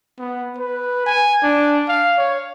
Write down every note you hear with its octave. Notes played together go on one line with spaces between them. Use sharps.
B3
B4
G#5
D4
F5
C#5